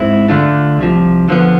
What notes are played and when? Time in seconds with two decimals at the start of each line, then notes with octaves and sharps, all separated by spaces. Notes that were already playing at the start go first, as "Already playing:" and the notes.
Already playing: G#2 G#3 C4 E4
0.28 D3 A3 D4 F4
0.78 C2 C3 F3
1.29 D3 F3 B3